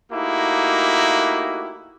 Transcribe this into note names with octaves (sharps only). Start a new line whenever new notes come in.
A3 A#3 D#4 E4 F#4 G4